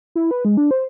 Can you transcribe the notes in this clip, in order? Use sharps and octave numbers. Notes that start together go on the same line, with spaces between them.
E4
B4
G#3
D4
C5